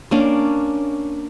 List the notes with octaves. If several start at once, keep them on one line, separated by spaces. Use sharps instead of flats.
A#3 C#4 D4